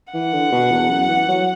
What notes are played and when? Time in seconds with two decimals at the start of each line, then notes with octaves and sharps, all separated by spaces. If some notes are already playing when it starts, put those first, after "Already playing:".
0.13 E3 F#5
0.33 D3
0.52 B2
0.71 E2
0.90 F#2
1.09 E3
1.28 F#3